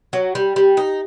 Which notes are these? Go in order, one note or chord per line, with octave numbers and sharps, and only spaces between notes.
F#3
G3
G3
D#4